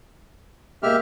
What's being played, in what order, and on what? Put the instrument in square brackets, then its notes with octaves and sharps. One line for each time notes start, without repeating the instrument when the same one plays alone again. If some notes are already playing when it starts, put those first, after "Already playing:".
[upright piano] G#3 A#3 [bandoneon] G4 E5 F6